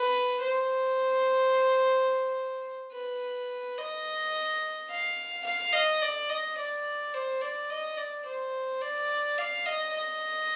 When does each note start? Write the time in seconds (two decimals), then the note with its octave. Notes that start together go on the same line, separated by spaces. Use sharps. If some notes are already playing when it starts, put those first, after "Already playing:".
Already playing: B4
0.41 C5
2.93 B4
3.78 D#5
4.90 F5
5.45 F5
5.73 D#5
6.02 D5
6.30 D#5
6.58 D5
7.14 C5
7.42 D5
7.70 D#5
7.98 D5
8.26 C5
8.82 D5
9.38 F5
9.66 D#5
9.94 D#5